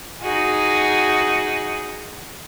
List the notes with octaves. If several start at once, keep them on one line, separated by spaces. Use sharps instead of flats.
D#4 F#4 G#4